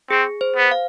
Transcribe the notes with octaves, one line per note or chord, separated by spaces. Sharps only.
C4 G#4
C5
B3
F5